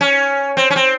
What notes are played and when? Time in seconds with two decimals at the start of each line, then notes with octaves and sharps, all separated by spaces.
0.01 C#4
0.57 C4
0.70 C#4
0.76 C4